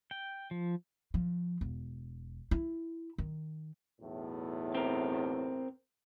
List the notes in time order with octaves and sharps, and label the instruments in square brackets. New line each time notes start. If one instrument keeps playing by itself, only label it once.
[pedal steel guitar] G5
F3
[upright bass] F3
E1
E4
D#3
[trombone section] B1 E2 A2
[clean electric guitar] C4 A#4